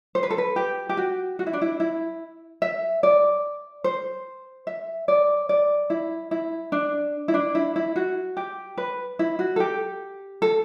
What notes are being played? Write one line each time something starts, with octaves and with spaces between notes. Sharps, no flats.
C5
B4
A4
B4
G4
G4
F#4
F#4
E4
D4
E4
E4
E5
D5
C5
E5
D5
D5
E4
E4
D4
E4
D4
E4
E4
F#4
G4
B4
E4
F#4
A4
G4
A4